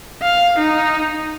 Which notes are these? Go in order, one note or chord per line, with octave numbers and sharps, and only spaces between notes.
F5
D#4